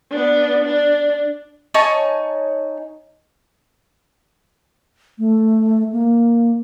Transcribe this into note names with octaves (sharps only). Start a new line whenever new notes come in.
B3 D4
D4
D#4 C#5 G#5 A5
A3
A#3